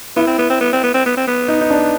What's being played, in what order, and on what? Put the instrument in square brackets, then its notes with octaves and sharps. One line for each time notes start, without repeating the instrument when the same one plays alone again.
[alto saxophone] B3 [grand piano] E4
[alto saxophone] C4
B3
C4
B3
C4
B3
C4
B3
C4
B3
[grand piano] D#4
D#4
D4